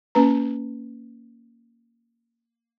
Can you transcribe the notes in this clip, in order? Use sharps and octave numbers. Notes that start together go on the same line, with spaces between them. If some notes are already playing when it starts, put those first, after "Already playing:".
A#3 C#4 B4 A#5